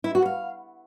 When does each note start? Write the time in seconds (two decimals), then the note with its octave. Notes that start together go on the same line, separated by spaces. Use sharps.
0.04 E4
0.15 F#4
0.25 F5